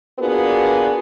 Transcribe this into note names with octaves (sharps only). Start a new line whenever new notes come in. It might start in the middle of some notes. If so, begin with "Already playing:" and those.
A#3 B3 D4 F4 F#4 G#4